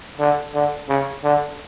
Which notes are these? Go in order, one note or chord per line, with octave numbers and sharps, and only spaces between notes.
D3
D3
C#3
D3